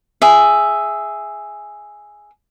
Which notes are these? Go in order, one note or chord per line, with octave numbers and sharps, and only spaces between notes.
G#4 E5